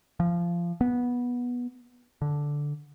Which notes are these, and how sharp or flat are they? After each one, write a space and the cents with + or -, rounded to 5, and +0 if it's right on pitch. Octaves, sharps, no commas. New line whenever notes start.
F3 -20
B3 -15
D3 -5